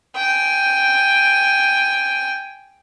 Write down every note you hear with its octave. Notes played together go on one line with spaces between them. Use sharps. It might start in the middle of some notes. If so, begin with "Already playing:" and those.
G5 G#5